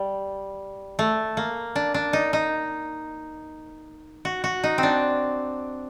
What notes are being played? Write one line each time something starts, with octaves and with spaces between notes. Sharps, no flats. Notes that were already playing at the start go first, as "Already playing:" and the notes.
Already playing: G3
A3
A#3
D4
D4
D#4
D#4
F#4
F#4
D#4
C4
D4